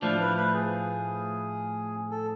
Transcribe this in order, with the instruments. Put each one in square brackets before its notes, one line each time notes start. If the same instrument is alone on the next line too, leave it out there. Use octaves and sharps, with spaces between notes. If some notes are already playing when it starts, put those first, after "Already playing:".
[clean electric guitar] A2 F3 A3 [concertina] D4
[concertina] B4
B4
G#4
A4